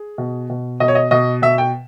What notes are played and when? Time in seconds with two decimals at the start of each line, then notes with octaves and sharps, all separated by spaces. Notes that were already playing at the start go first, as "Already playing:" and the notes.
Already playing: G#4
0.18 B2
0.50 B2
0.80 B2 D#5
0.88 C#5
0.95 D#5
1.11 B2 D#5
1.42 B2 E5
1.58 G5